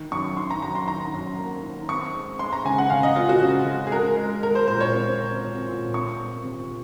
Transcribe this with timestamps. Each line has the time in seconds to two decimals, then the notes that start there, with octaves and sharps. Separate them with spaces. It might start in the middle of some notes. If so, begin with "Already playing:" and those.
Already playing: D#3
0.12 F#2 C#6
0.37 D#3 C6
0.51 A#5
0.62 F#2 A#5
0.75 C6
0.88 D#3 A#5
1.14 F#2
1.39 A#3
1.63 D#3
1.89 C4 C#6
2.14 G#3
2.39 G#3 C6
2.53 A#5
2.65 C#3 G#5
2.78 F#5
2.90 C#3 F5
3.03 D#5
3.15 C4 F4
3.29 F#4
3.41 C#3
3.66 G#3
3.87 G#4
3.91 G#3 A#4
4.17 G#3
4.42 G#3 A#4
4.55 C5
4.68 A#2 C5
4.80 C#5
4.93 C4
5.19 C4
5.43 C4
5.68 A#2
5.94 C4 C#6
6.20 C4
6.45 C3